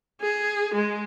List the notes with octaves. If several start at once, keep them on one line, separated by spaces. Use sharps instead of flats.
G#4
G#3 G#4